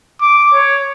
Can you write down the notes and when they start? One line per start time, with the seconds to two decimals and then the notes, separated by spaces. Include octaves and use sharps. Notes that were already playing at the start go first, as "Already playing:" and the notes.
0.21 D6
0.53 C#5